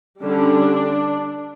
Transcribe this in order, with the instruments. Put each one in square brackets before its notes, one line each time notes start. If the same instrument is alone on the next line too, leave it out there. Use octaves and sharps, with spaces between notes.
[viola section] D3 G3 C#4 D4